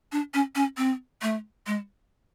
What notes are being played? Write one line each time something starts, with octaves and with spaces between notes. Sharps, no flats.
D4
C#4
C#4
C4
A3
G#3